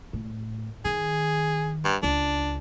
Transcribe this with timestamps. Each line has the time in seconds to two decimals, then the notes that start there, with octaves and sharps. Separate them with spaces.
0.13 A2
0.85 D#3 G#4
1.85 G2
2.03 C#2 D4